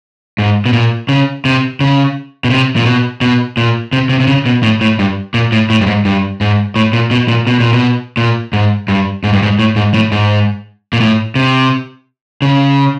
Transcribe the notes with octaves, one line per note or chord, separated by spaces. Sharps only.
G#2
B2
A#2
C#3
C3
C#3
B2
C3
A#2
B2
B2
A#2
C3
C3
C3
C#3
B2
A2
A2
G2
A#2
A2
A2
G2
G#2
G2
G#2
A2
A#2
B2
A#2
B2
A#2
B2
A#2
G#2
G2
G#2
G2
G#2
A2
G#2
A2
G#2
A#2
A2
C3
C#3